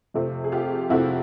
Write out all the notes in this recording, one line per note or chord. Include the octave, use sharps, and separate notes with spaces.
F2 C3 F3 A3 C4
G#4
F4 G4
F2 C3 F3 A3 C4 E4 F#4